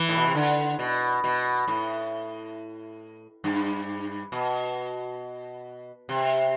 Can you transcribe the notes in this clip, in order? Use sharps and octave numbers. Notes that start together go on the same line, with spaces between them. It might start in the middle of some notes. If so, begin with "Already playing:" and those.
Already playing: E3
A2
B2
C3
D3
B2
B2
A2
G2
B2
C3